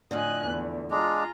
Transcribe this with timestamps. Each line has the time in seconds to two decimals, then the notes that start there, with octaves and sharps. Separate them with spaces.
0.11 F2 A2 D3 D#5 G#5 F#6
0.46 E2
0.91 G#3 D4 F4 G#4 A#5